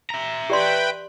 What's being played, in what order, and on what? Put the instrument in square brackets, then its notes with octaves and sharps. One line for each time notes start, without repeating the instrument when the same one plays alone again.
[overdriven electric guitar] E5 A#5
[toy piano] G4 D5 C6 [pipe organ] B4 G5 B5